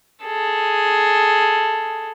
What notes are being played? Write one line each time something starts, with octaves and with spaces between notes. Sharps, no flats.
G#4 A4